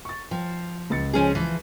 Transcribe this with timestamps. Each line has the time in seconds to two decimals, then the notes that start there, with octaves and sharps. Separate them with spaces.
0.05 C#6 A6
0.31 F3 G5
0.90 C#2 A6 C#7
1.13 F3 C#4 G#4
1.35 E3 F3